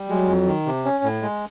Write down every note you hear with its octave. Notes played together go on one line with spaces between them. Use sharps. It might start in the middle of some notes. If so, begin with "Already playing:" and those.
Already playing: G3
F#3 G#3
F2
D#3
C3
C#4
A2
G#3